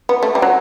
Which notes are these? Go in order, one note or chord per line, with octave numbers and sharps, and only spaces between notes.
B3
A3
G3
F#3